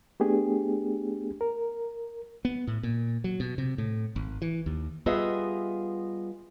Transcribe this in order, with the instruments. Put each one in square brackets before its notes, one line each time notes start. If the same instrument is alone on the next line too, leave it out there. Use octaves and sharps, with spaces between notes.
[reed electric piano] A3 B3 D4 G4 G#4
A#4
[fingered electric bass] B3
A2
A#2
F#3
B2
C3
A2
G#1
E3
D#2
[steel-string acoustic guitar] G3 B3 F4 G#4 D#5 E5